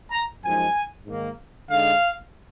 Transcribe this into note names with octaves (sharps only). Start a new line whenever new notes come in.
A#5
F#2 F3 G#3 D#4 G#5
G#2 D#3 A#3
D3 G#3 D#4 F5